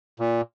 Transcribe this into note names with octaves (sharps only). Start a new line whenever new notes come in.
A#2